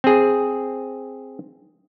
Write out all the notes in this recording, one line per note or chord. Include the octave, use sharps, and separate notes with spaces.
C4 G#4